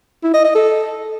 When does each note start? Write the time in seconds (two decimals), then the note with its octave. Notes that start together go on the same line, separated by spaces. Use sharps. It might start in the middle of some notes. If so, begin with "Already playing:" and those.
0.24 E4
0.34 D#5
0.44 D#5
0.55 A4